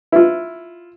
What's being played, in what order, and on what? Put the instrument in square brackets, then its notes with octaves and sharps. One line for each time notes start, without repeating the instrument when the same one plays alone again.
[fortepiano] E4 F4